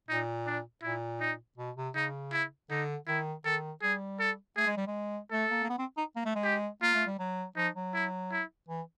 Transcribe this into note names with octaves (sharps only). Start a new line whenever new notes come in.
A#2 D#4
D4
A#2 E4
D#4
B2
C3
C#3 D#4
E4
D3 D#4
D#3 E4
D#3 A4
G3 G#4
A4
A3 G#4
G#3
G3
G#3
A3 A4
A#3
A#3
B3
C4
D#4
A#3
A3
G#3
G4
A#3 F4
A3
G3
F#3
F3 D#4
F#3
E4
E4
E3